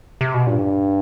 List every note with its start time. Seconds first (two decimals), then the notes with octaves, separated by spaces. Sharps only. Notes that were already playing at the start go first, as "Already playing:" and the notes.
0.21 C3
0.34 B2
0.47 G2 A#2